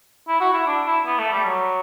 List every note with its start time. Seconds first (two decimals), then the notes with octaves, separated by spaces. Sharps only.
0.28 E4
0.41 F#4
0.54 E4
0.67 D4
0.87 E4
1.07 B3
1.19 A3
1.32 G3
1.45 F#3